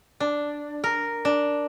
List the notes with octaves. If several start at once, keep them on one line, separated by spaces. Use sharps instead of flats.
D4
A#4
D4